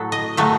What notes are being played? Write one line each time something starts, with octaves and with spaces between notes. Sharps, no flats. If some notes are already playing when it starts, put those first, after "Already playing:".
Already playing: A2 F#3 A3 A4
D#5
D#3 F#3 A3